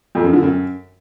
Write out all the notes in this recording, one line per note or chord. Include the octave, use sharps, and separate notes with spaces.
F2
F#2
D3
F#2